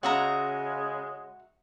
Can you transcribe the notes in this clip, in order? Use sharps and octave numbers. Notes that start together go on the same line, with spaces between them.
C#3 G#3 F#4 E5 A#5